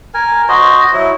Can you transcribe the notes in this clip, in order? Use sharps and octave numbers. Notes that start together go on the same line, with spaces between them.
A#4 G#5
F#4 C5 D#5
F#3 E4